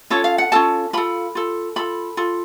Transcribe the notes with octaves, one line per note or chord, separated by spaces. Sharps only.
C#4 F4 A4 C#5
F5
F#5
C#4 F4 A4 A5
F4 A4 B5
F4 A4
F4 A4 B5
F4 A4